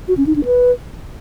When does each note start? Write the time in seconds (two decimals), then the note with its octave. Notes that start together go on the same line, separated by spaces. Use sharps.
0.08 F#4
0.17 C#4
0.27 D#4
0.36 D4
0.45 B4